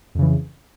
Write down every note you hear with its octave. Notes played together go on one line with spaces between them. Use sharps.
F2 C#3 E3